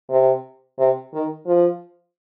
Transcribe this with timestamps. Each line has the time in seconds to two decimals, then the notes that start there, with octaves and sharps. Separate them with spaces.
0.10 C3
0.79 C3
1.13 D#3
1.47 F3